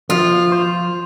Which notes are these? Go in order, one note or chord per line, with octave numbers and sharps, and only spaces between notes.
F3 F4
C5